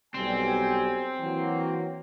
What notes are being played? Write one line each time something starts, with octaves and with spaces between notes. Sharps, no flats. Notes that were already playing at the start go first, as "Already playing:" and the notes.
B1 G3 C4 G#5
E3 F#3 A#3